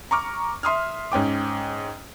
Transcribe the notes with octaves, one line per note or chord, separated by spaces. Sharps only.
A#5 C#6 D6 F6
E5 C6 D#6 F6
G#2 C#4 G5 D6